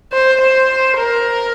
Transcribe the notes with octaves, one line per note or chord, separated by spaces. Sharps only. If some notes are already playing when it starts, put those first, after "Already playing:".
C5
C5
A#4